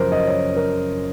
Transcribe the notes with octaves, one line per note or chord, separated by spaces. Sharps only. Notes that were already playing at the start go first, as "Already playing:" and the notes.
Already playing: F#2 C#3 F3 A#4 C5
D#5
C#5
A#4